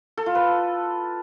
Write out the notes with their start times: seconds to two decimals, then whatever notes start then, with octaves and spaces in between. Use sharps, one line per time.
0.17 A4
0.26 F4
0.35 B4